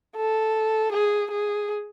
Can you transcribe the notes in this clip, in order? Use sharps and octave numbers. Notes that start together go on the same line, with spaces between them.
A4
G#4
G#4